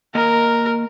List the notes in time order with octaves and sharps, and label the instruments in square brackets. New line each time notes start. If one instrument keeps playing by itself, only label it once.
[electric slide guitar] A#3 D#5 [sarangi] A#4